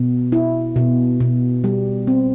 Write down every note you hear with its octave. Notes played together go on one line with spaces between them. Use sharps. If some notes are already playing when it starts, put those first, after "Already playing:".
Already playing: B2
E4
B2
B2
G3
C4